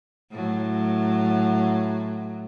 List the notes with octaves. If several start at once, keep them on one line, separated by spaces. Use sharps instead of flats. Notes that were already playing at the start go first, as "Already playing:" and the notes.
A2 F#3